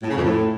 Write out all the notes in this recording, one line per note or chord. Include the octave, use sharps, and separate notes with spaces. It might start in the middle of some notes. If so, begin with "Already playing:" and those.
A2
C#3
F2
A2